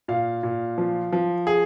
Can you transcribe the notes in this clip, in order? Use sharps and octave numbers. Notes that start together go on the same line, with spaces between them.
A#2 F5
A#2
F3
F3
G#4